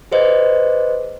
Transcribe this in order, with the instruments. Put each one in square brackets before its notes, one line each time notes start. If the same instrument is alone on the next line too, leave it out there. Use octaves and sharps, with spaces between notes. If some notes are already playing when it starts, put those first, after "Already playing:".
[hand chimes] G#4 B4 C5 D#5